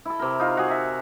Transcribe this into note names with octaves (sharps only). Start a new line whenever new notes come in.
E4 A4
C3 A#4
D#4 F4
F#4 G#4
E5